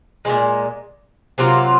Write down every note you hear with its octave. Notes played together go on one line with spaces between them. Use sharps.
A#2 F3 G#3
C3 F#3 A#3 F4